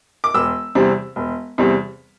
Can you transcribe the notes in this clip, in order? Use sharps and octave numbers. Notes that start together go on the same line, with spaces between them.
D6
E1 E6
E2 C3 G3 C4
E1
E2 C3 G3 C4